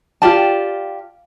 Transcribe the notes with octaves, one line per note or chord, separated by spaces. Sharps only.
F4 G4 D5 A5